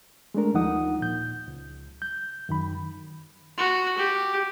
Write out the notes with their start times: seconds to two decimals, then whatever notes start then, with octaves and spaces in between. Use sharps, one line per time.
0.34 G#3 A3 D4 A#4
0.54 D#2 F3 D#4 F#5 D#6
1.01 A#2 G6
1.48 C#2
2.02 G6
2.49 F#2 D#3 B5
3.57 F#4
3.97 G4